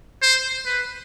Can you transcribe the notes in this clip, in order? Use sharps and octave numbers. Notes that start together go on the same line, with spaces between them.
C5
B4